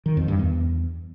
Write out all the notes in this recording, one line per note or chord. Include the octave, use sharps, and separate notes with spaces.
D#3
F2
G2
E2